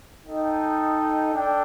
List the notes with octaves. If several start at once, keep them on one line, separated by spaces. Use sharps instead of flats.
D#4 A4 D#5 G5
D4 A4 G5